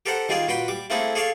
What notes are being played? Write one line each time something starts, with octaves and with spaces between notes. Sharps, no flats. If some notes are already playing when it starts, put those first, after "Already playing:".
G4 A4 A#4 C5 F#5
D#3 G3 F4 G#4 D5
A#2 F#4 B4 G5 C6
G3 D6
A3 A#3 C4 E4 G#4 A4
G#4 A4 C#5 D5 F5 A5